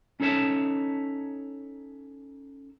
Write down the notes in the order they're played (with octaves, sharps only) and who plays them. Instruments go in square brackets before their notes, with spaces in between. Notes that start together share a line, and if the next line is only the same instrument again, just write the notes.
[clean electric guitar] C#4 D#4 A4 C#5 E5 A5